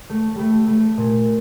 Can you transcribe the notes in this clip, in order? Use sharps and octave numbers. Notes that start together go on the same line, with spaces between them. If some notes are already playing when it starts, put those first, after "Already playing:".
A3
G3 A3
A3
A#2